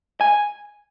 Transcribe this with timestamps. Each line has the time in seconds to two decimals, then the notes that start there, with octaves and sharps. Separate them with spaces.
0.21 G#5